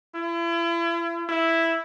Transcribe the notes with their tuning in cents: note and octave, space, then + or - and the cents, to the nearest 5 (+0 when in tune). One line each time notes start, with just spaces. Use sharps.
E4 +40
E4 +0